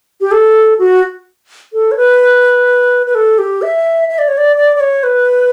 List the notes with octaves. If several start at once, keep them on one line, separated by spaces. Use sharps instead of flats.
G4
A4
F#4
A4
C#5
B4
B4
A4
G4
E5
E5
D5
C#5
D5
D5
D5
C#5
B4